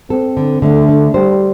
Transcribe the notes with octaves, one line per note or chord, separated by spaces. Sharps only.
C4 A4
D3
D3 A3
D4
G3 C5